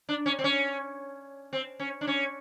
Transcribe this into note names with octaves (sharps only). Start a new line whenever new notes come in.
D4
C#4
C4
C#4
C4
C#4
D4
C#4